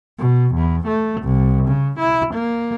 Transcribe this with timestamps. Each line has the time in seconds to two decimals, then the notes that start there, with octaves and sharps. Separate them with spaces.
0.18 B2
0.54 E2
0.87 A3
1.21 C2
1.68 C#3
1.99 E4
2.34 A#3